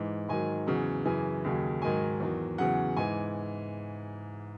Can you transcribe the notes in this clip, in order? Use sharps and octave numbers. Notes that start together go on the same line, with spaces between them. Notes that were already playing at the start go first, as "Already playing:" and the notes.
Already playing: G#2 E3
G#2 D#3 F#3 G#5
E2 C#3 F#3
F#2 C#3 E3 G#5
D#2 C#3 F#3
G#2 D#3 F#3 G#5
E2 D#3 F#3
E2 C#3 F#3 F#5
G#2 E3 G#5